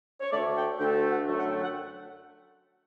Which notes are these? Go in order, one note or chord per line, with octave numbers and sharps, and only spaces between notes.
C#5
D2 D3 A3 D5
G5
D2 D3 A3 G5
F#5
F#2 D3 F#3 A3
F#5
G5
F#5